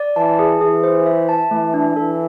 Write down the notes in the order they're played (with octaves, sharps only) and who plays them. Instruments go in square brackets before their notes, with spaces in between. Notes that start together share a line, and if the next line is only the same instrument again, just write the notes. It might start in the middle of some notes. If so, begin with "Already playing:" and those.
Already playing: [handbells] D5
[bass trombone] E3 [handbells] A5
[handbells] G#4
[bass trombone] E3 [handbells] G#4
[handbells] C5
E5
A5
[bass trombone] E3 [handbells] A3
[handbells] D4
[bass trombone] E3 [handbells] A4